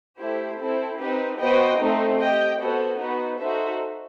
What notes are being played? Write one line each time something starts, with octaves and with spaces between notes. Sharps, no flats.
A3 E4 G4 C5
C4 E4 A4
C4 D#4 G4 B4
B3 F#4 C5 D#5 G5
A3 C4 D#4
G4 D#5 G5
B3 F#4 A4 C5
B3 D#4 F#4 B4
D#4 F#4 A4 C5 E5